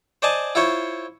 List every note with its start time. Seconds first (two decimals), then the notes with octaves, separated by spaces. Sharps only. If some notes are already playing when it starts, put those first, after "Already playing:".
0.22 C5 D5 D#5 G#5 A5
0.55 E4 F4 C5 C#5